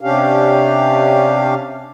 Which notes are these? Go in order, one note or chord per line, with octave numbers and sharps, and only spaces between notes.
C3 C#4 D4 G4 F5